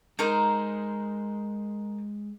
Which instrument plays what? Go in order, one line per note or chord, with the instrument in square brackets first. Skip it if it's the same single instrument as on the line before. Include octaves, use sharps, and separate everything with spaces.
[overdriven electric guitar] G#3 [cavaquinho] D#4 A#4 C5